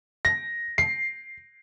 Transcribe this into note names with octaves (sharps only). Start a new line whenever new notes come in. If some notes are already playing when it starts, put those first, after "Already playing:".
A#6
C7